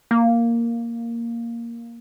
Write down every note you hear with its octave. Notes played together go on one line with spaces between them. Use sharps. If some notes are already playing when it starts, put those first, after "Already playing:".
A#3